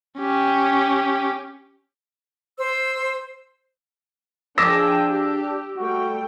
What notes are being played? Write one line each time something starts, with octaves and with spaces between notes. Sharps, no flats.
C#4 G4
C5 E6
F3 D4 G#4 G5 D6 E6 A#6
G4
G3 A3 F#4 G5